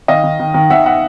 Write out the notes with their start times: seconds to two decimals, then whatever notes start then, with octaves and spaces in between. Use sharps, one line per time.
0.08 D#3 D#5 F5
0.24 D#3
0.39 D#3
0.54 D#3
0.70 D#3 E5 F#5
0.86 E5 F#5